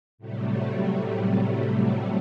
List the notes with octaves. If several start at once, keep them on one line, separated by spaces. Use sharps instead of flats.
A2 C3 F#3 G3 A3